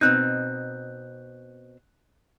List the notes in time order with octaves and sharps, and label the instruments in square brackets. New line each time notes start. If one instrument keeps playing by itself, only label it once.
[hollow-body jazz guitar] B2 C4 D#4 [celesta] F#6 G6